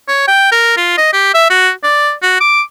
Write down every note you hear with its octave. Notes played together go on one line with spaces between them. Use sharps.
C#5
G5
A#4
F4
D#5
G4
E5
F#4
D5
F#4
D6